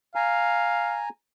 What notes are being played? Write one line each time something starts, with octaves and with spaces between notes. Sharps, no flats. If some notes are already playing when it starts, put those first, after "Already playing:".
F5 G#5 A#5